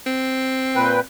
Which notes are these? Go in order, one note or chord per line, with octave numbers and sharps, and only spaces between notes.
C4
A#2 B4 G5